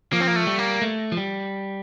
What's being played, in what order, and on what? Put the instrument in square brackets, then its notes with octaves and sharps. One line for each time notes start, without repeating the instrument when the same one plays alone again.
[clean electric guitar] F3 [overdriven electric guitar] A#3
[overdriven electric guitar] C4
A#3
A3
[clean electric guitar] G3
[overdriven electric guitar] A#3
[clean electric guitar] A3
F3
G3